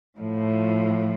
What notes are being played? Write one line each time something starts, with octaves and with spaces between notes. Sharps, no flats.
A2 F3